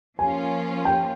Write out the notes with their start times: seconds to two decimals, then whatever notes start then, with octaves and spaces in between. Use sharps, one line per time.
0.19 F3 A#3 C#4 F4 G#5
0.85 G5